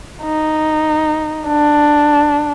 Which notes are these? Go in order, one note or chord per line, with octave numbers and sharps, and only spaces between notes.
D#4
D4